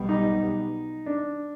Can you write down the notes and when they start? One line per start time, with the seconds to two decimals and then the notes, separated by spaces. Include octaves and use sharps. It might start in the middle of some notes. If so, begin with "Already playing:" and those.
Already playing: B1 B2 G3 B3
0.09 D#4
1.06 D4